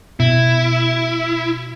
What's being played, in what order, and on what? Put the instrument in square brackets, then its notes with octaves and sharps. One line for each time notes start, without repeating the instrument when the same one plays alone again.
[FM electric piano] B2 [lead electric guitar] E4